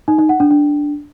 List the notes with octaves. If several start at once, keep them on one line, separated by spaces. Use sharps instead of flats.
D#4
D#4
F#5
D4
D4